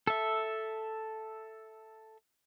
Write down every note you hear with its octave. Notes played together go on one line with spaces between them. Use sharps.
A4 E5